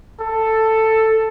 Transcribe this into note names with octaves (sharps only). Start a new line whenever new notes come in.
A4